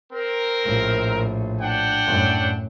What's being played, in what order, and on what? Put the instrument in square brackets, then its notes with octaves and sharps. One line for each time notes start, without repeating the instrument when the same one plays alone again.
[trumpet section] C4 A#4
[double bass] A#1 A2
[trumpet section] D4 F#5 G5
[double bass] F#2 A2